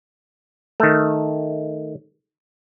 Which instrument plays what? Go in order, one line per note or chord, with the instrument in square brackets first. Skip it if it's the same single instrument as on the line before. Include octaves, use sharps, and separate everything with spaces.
[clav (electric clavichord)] D#3 A3